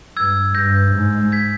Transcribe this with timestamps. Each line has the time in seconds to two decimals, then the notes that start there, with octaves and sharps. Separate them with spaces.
0.17 G2 E6 G#6
0.55 G2 G6 A#6
0.94 G#2
1.32 G#6 B6